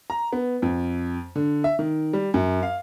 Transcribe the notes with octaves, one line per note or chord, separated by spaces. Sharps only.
A#5
B3
F2
D3
E5
D#3
G3
F#2
F5